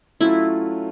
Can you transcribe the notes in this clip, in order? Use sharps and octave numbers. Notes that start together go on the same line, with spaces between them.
F#3 A3 C#4 E4 F4